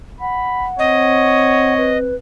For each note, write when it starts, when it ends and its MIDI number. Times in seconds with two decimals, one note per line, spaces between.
0.21 1.74 78
0.21 0.66 83
0.79 2.19 60
0.79 1.93 73
0.79 1.98 75
1.77 2.15 71